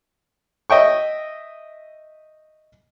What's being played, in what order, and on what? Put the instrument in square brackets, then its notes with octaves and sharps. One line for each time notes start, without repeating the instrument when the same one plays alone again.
[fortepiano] D#5 E5 G5 C#6